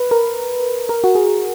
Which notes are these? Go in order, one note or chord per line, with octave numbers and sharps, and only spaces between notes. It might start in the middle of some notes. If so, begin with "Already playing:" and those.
Already playing: B4
A#4
A#4
F#4
G#4